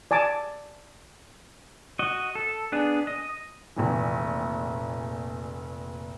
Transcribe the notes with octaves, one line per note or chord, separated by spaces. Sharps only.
D5 G#5 A5 D6
F#4 D#5
A4
B3 D4 G#4
D#5
F1 A#1 E3